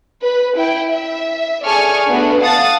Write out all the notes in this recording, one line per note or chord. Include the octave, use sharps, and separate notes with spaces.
B4
E4 G5
E5
G#4 A4 D5 G#5 C#6 F6
A3 B3 D4 F#4 B4
F5 F#5 A5 D#6 A6